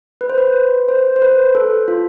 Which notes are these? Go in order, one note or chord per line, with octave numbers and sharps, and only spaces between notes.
B4
C5
B4
C5
C5
B4
A4
F4